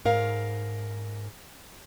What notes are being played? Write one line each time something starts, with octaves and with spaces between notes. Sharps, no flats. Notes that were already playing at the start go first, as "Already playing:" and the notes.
G#2 A#4 F5